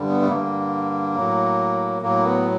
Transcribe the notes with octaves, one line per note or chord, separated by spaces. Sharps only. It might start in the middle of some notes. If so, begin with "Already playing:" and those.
Already playing: G2 D3 G3
B3
A3
G2 D3 G3 A#3
A2 F#3
A2 F#3 A#3
B3